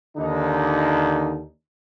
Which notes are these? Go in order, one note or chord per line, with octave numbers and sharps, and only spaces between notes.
D#2 D3 D4 D#4